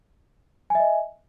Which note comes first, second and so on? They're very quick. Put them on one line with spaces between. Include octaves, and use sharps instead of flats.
G#5 E5 D#5